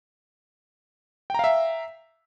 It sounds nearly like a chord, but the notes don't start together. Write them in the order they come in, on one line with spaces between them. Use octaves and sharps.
G5 A#5 F5 E5